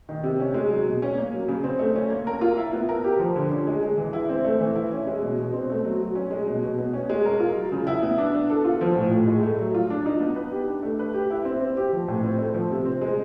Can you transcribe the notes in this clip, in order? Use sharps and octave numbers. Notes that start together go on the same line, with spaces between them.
D#3
C3
C#4
G#3
F#3
B2
C#4
A#3
F#3
C#3
C4
A3
C#4
A#3
A#4
F4
E4
B3
A#4
G4
F3
D3
C#4
G#3
G#3
E3
E4
C4
A3
E3
E4
C#4
G#3
B2
B2
C4
A3
F#3
F#3
C#4
G#3
B2
B2
B3
C#4
G#3
A#4
F4
F#3
C#3
E4
B3
D4
B3
A4
F4
F3
A2
A2
G#3
A3
F#3
F4
D4
D#4
B3
B4
G4
D4
A3
B4
G4
E4
C4
C4
G4
F3
A2
C4
A3
F3
C3
C4
G#3